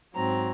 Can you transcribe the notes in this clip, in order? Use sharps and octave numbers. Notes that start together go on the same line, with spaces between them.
G#2 F#3 C4 A#5